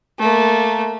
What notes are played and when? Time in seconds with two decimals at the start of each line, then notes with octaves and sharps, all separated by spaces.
0.19 A3 A#3